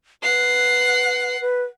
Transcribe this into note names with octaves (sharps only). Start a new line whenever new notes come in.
B4 F#5 C7
B4